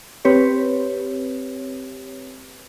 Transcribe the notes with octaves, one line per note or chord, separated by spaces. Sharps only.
C4 G4 B4 C#5